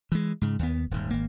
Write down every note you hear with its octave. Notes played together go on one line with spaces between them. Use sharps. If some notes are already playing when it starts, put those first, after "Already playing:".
E3 G#3
G#2 C#3
D#2 B3
D#1 G#2
G#1 A#3